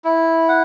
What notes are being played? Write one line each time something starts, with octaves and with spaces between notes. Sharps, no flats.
E4
F#5